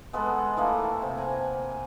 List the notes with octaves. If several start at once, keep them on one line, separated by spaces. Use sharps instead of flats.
G#3 B3 A4 B4
E3 A3 A#3 A4
C3
F#5 G#5 A#5